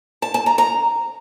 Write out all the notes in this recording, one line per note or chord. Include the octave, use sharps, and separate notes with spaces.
A5
A5
A#5
A#5